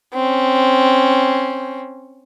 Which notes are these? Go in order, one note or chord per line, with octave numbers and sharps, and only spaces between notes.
C4 C#4